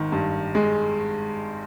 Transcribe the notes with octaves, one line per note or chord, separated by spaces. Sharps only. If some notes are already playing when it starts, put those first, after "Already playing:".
Already playing: G#1 D#3
G2
G#3